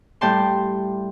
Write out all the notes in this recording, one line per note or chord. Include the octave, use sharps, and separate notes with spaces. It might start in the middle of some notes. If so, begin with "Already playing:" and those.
A2 G3 G5 A5 C6